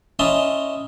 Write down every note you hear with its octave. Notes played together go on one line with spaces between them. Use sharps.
C#4 E4 D#5 A5 A#5 C6